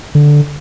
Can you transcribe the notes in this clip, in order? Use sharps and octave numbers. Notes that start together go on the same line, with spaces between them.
D3